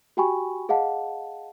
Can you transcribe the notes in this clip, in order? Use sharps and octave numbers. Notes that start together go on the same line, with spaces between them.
F#4 G4 G5 G#5 B5 C#6
G#4 D#5 F5 F#5 A5